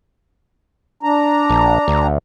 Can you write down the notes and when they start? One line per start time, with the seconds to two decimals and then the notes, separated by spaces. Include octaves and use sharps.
1.03 D4 A#5
1.50 A#1
1.88 D2